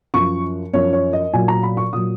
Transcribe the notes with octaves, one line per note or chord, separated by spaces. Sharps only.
F#2 F3 C#6
F#2 F3 C#5
C#5
D#5
A#2 F#3 G#5
A#5
B5
C#6
A#2 F#3 D#6